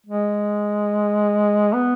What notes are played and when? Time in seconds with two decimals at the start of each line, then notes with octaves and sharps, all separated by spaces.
0.06 G#3
1.73 B3